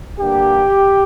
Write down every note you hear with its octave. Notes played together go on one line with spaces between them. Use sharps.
G2 D3 A#3 G4